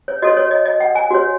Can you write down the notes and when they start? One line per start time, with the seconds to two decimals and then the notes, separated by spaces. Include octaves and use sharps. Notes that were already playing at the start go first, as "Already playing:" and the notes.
0.08 C#5
0.22 F#4 A4 C#5 D#5
0.37 C#5
0.51 D#5
0.66 D#5
0.80 F#5
0.95 G#5
1.11 F#4 C#5